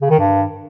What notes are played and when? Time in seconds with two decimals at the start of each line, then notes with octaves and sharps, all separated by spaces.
0.01 C#3
0.10 D#3
0.19 G2